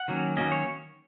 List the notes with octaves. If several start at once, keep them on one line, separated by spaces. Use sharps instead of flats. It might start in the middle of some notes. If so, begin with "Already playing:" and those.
Already playing: F#5
D#3 F#3 A#3 C#4
D#3 F#3 A#3 C#4 D#5
C#5